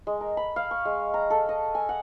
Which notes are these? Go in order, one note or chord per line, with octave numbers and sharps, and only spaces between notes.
G#3
A#4
B5
F5
C#6
G#3
A#5
A4
D#5
G#5
F#5